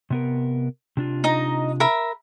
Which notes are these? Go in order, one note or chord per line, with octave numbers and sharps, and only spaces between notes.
C3 B3 A#4
C3 D4 F4
D#4 D#5 A#5
A#4 E5 B5